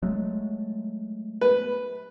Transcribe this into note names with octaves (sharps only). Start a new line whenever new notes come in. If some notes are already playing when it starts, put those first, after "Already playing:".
F#3 G#3 A3
B4